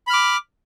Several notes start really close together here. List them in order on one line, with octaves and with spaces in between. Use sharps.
B5 F6 D6